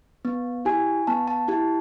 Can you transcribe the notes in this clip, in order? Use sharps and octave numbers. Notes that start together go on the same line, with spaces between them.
B3
E4 G4 G#5
B3 A5
A5
E4 G4 A5